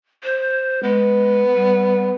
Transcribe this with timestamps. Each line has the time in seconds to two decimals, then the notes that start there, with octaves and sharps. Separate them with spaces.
0.23 C5
0.83 G#3 B3
1.55 G3